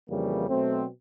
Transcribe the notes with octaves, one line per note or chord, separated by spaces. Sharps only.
F2 C#3 E3 G3 A#3
B2 F#3 A3 C4